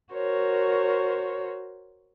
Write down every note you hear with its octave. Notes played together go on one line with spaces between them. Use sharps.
F#4 A#4 C5 C#5